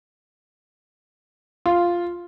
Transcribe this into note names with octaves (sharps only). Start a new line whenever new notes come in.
F4